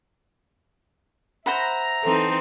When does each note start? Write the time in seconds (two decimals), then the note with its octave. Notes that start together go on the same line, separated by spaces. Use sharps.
1.46 C5 E5 F#5 A#5 B5
2.04 E3 C4 D#4 A4